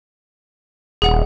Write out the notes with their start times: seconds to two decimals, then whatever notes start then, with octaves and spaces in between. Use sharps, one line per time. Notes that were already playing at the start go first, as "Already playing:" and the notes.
1.02 D#1 G#4 F#5